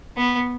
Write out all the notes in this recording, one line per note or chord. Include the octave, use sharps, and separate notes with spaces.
B3